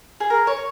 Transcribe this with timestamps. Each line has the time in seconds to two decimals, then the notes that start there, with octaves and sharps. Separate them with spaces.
0.20 G#4
0.30 A#4
0.47 C#5